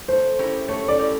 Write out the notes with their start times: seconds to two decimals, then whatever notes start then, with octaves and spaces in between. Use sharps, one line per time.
0.08 A3 C5
0.38 C#4 E4 G4 A#4
0.68 A3 C#5
0.88 D5
0.98 C#4 E4 G4 A#4